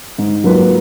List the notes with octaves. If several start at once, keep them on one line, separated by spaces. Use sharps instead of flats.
G#2
F#3 A#3 F4 B4